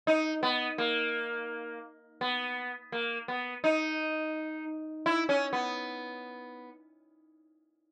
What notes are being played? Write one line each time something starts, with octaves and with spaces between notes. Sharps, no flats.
D#4
B3
A#3
B3
A#3
B3
D#4
E4
C#4
B3